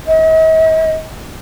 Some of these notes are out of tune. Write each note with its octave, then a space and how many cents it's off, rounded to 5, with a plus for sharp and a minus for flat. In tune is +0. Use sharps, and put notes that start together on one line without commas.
D#5 +45